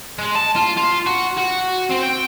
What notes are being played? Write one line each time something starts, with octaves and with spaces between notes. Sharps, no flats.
G#3
A5
F4
F4
F#4
F#4
C4
G5